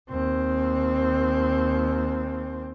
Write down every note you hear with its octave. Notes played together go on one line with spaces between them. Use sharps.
D#2 C4